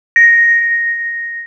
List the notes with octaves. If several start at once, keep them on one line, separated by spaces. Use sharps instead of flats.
A#6